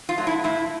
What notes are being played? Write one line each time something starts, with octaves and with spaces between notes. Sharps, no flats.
F4
F#3 A3
E4
A2 E4